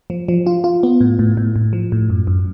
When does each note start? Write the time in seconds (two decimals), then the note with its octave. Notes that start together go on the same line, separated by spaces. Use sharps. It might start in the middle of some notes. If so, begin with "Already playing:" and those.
0.10 F3
0.28 F3
0.46 F4
0.64 F4
0.83 B3
1.01 A2
1.19 A2
1.37 A2
1.56 A2
1.73 F3
1.92 A2
2.10 F#2
2.27 F#2